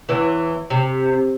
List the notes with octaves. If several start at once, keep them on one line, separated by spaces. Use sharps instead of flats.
E2 E3
C3